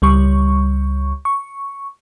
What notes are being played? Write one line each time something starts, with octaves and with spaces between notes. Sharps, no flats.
C#2 G3 C#6
C#6